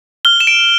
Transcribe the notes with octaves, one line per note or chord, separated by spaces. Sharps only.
F6 G7
E7
D7